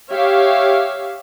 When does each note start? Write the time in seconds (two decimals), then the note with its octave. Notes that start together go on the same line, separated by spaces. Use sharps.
0.10 G4 C#5 E5 F5